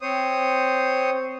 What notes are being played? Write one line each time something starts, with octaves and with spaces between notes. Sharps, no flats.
C4 C5 C#5 D#6